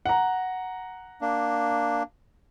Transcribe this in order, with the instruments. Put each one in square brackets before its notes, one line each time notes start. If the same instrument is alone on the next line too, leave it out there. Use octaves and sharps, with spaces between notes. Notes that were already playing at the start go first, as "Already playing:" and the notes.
[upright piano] F#5 A#5
[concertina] A#3 D4